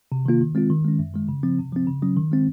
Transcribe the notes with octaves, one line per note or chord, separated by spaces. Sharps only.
C3
D#3 A#3 F4
D#3
G#3 C4 F4
D#3
G#3 C#4
F#2
D#3 G#3
C#3
F3 C4
C3
F3 C4
C#3
F#3 C#4
D#3
G#3 C4